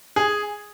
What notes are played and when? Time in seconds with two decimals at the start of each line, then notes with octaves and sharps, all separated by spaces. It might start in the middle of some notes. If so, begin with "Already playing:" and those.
0.16 G#4